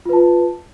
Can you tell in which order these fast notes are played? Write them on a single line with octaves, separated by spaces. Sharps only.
F4 B4 A5